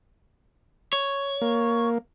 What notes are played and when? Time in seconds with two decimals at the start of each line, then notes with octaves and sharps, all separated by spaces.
0.93 C#5
1.42 A#3